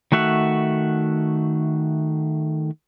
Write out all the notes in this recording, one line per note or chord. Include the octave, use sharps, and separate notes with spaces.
D#3 A3 F#4 E5 F#5